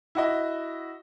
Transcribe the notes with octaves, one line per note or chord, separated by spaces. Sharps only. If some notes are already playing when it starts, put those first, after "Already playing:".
E4 F#4 D#5